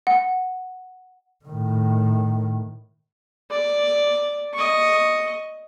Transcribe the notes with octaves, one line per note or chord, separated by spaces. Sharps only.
F#5
A2 D#3
D5
D#5 C#6